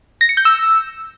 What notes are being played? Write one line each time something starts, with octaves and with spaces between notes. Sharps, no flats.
A#6
C#7
G6
E6